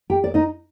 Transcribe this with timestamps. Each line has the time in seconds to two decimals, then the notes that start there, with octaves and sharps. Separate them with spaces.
0.10 G4 G5
0.24 D5
0.34 D#4 D#5